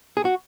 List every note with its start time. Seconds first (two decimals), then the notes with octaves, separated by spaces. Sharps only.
0.17 G#4
0.25 F#4